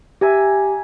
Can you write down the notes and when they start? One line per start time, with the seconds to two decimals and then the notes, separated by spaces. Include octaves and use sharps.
0.21 G4 E5 G#5 A#5